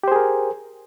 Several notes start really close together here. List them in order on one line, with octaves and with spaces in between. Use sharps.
G4 C5 G#4 A#4